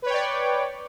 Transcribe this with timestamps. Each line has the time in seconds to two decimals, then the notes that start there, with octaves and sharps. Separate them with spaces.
0.02 B4
0.06 C#5
0.10 G5
0.14 D5